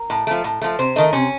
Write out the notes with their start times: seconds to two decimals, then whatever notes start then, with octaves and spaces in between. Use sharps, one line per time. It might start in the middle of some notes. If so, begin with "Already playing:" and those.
Already playing: A#4
0.10 A2
0.27 F3 A3
0.44 A2
0.62 F3 A3
0.79 C3 C5
0.96 D#3 A3 D#4
1.13 C3 C#4